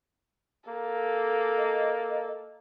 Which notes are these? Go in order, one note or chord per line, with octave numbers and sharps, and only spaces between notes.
A#3 A4
D#5